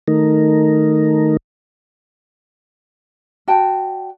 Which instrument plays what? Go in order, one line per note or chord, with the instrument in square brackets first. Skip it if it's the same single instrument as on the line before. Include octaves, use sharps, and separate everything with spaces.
[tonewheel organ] D#3 A3 D#4 A#4
[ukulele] F#4 D5 G5 A5